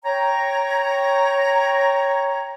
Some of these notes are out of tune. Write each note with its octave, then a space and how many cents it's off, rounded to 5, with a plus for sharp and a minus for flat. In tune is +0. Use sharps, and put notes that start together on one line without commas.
C#5 +0 G5 +0 A#5 +0